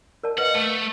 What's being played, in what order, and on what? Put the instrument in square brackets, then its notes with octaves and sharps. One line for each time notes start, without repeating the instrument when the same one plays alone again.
[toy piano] A#4 D5 A5
[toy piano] B4 D#5 F5 [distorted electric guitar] F#5
[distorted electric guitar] A3 [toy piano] A5 C#6